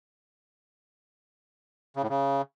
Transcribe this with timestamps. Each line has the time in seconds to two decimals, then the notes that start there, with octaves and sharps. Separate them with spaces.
1.96 C#3
2.03 A2
2.09 C#3